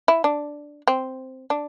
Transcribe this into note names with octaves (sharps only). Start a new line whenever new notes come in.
E4
D4
C4
D4